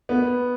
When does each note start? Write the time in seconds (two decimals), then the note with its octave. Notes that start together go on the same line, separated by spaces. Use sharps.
0.09 B3